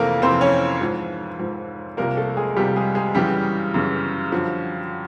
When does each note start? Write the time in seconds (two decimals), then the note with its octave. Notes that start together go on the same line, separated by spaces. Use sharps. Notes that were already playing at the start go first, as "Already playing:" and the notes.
Already playing: F2 C3 E3 A3 A#3 A4 A#4
0.22 F2 C3 E3 C4 C5
0.41 C#4 C#5
0.81 G#2 F3
1.39 G#2 F3
1.97 C2 C3 F3 A#3 A#4
2.17 A3 A4
2.37 G#3 G#4
2.56 C2 C3 F3 G3 G4
2.76 G#3 G#4
2.95 G#3 G#4
3.14 F#2 C#3 E3 G3 G4
3.74 F#2 C#3 E3
4.32 F#2 D3 F3